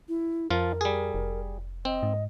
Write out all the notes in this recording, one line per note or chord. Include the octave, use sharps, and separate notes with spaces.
E4
F2 F3 F4 A#4
G3 G#4
F1
C4 D#5
G#2